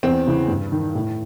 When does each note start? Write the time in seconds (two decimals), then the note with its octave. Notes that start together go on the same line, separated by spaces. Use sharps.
0.03 E2 C4
0.27 C#3 E3
0.48 G2
0.72 D#3
0.95 A2